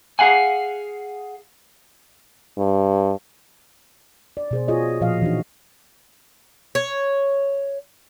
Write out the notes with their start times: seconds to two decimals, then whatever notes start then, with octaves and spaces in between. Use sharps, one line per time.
0.19 G#4 F5 F#5 G#5
2.58 G2
4.37 D5
4.51 B2 G#4 C5
4.68 F4 F#4 G#4 C#5 D#5
5.01 A#2 F3 D#5 F5
5.22 E3 D4 D#4 F#4
6.75 C#5